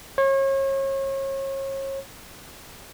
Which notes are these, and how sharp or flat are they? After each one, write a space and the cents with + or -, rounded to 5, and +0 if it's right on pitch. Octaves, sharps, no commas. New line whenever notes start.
C#5 -35